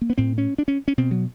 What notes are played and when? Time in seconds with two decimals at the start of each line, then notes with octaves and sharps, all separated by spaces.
0.02 A#3
0.10 B3
0.18 A2 C4
0.38 C#4
0.58 D4
0.68 C#4
0.88 C#4
0.98 B2 C4
1.11 F#3